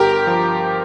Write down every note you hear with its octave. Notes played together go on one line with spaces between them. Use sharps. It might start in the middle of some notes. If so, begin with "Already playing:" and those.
Already playing: G1 G4 A#4
F3